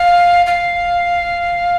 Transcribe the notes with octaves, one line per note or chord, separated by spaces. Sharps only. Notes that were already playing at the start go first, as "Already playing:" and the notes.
Already playing: F5
F5